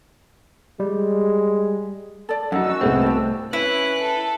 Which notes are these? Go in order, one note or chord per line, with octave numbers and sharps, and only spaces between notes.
G3 G#3
A4 D5
F#2 D#4 F#4 F#5 E6
C2 G#3 A3 B3 C4
G4 A4
C#4 E4 B4 F#6
A4